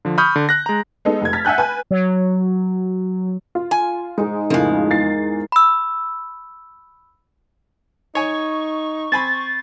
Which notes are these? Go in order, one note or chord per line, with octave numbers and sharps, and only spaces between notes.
D3 F3
B5 C#6 D#6 F6 G6
D3
F#6 A#6
G#3 A#5
G#3 B3 D#4 A4
F1 G#6
F6 A6 B6
E5 F#5 G#5 F#6 G6
B4 G#5
F#3
F4
G#5
G#2 G#3 D#4 G#4
F2 A2 C#3 F3 G#3 A#4
E2 A6 C7
B5 E6
D#4 C#5 G#5 C#6
C4 G#5 B5 A6